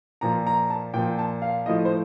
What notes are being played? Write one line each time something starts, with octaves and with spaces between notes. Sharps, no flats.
A#2 F3 A#5
A#5
A5
A#2 F3 G5
A5
F5
A2 F3 D#5
C5